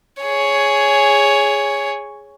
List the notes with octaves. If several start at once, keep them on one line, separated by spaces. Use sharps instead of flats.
G#4 C#5